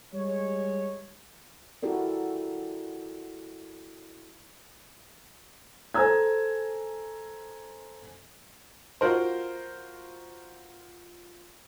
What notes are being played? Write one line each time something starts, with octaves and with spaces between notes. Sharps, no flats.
G3 G#3 C#5
E4 F#4 G4 A4 A#4 D5
A4 C5 G#5 A#5 E6 G#6
F4 F#4 A#4 C5